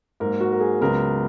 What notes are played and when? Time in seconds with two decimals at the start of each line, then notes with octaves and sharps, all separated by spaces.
0.20 G#2 F#3 A#3 A#4
0.40 F#4
0.52 A#4
0.60 G#4
0.81 C#2 C#3 F#3 B3 A#4